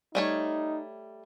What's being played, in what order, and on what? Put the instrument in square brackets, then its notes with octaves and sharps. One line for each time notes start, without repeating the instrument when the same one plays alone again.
[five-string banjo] G3 A3 C#5 [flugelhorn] D#4